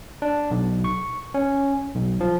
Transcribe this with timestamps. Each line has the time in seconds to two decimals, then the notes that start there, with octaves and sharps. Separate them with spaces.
0.22 D4
0.51 B1
0.84 C#6
1.34 C#4
1.95 B1
2.21 F3